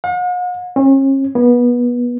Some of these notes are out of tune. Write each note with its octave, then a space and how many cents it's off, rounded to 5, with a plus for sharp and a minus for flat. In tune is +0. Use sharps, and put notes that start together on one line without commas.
F#5 -45
C#4 -40
B3 -25